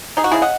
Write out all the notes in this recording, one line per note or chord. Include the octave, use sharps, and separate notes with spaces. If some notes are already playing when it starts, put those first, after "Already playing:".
D#4 G#4
F#4
C#3 E4 G#4
D#5 F#5